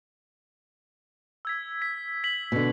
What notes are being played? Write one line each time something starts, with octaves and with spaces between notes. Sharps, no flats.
E6 G#6 B6
B6
B6 F#7
B2 D3